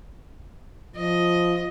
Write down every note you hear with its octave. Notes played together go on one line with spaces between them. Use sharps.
F3 D#5